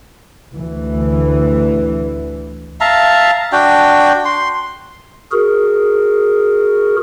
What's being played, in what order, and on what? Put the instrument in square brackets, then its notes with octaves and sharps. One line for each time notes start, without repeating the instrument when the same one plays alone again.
[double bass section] D2 E3
[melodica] E5 F5 A5 A#5
D4 F#4 G5
C6
[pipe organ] F#4 G#4 A#4